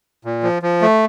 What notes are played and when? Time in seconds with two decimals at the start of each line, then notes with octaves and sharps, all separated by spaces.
0.25 A#2
0.43 F3
0.62 F3
0.82 A3